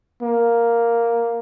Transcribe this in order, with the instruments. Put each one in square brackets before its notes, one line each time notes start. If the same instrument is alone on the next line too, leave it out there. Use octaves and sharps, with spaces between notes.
[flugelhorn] A#3